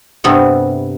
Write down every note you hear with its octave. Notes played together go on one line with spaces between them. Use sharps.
G2 C3 B3 A4